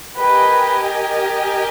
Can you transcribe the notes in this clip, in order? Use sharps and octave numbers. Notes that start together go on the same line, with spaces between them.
G4 A#4 B4 D#5 G#5